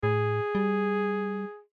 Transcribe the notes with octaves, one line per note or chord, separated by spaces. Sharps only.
A2 G#4
G3